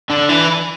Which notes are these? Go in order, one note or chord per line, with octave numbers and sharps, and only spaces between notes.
D3
E3